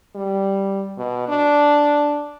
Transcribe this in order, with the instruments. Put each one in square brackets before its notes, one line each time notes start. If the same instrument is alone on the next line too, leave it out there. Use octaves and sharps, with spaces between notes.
[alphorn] G3
B2
D4